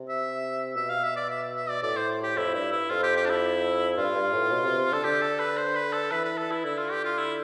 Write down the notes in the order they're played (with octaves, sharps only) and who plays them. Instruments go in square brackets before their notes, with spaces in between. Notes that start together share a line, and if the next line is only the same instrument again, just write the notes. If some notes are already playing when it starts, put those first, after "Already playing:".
Already playing: [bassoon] C3
[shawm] E5
[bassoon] B2 [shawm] E5
[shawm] F5
E5
D5
E5
E5
D5
[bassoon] A2 [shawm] D5
[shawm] C5
G4
[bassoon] F2 [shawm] E4
[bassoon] G2 [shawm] E4
[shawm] E4
[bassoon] F2 [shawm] F4
[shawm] G4
G4
D4
E4
[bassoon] G2 [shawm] F4
[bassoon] G2
A2
B2
C3
C3
[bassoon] D3 [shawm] A4
[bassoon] D3 [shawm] G4
[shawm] A4
B4
C5
B4
A4
[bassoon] E3 [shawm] B4
[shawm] B4
A4
E4
[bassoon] D3 [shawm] E4
[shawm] F4
G4
F4
E4